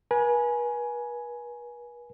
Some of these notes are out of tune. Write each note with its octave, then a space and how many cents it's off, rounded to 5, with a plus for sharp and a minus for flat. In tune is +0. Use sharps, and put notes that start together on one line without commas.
B4 -40 G#5 +10